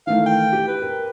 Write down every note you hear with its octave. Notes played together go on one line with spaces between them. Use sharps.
D#3 E3 A3 F5
G5
G4
B4
A#4